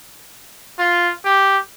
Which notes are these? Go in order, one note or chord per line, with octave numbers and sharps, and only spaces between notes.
F4
G4